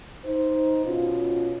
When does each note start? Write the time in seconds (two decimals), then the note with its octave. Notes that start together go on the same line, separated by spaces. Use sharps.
0.25 D#4 C5
0.86 B2 C#4 F4